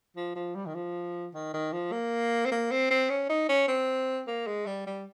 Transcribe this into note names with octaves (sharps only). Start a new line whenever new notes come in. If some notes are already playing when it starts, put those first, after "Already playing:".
F3
F3
G3
D#3
F3
D#3
D#3
F3
A#3
C4
A#3
C4
C4
C#4
D#4
C#4
C4
A#3
G#3
G3
G3